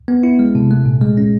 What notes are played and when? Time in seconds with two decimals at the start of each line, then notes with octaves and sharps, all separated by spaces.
0.08 B3
0.23 E4
0.39 G#3
0.55 C3
0.71 A3
0.86 A#2
1.01 G#3
1.17 C#4